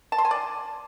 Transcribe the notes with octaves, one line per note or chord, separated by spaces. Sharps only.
A5
C6
G#5
D5